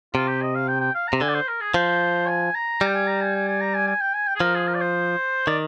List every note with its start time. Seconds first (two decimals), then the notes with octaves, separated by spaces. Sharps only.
0.15 C3 F4
0.28 G4
0.41 D#5
0.55 F5
0.68 G5
0.81 G5
0.95 F5
1.08 C3 A#5
1.21 D3 G#5
1.29 D5
1.34 C5
1.48 A#4
1.61 G#4
1.74 F3 C5
2.27 G#5
2.55 A#5
2.81 G3 G5
2.94 G#5
3.07 A#5
3.21 G#5
3.34 G#5
3.47 G#5
3.61 A#5
3.74 G#5
3.87 G#5
4.01 G5
4.14 G#5
4.27 G5
4.36 G#4
4.40 F3 A#4
4.55 G#4
4.68 A#4
4.74 D5
4.81 C5
5.47 D#3 D5